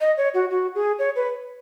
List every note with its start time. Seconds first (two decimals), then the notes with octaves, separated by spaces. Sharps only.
0.01 D#5
0.17 C#5
0.34 F#4
0.50 F#4
0.75 G#4
0.99 C#5
1.16 B4